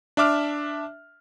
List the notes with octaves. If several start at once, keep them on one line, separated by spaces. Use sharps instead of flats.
D4 E5 D6 F6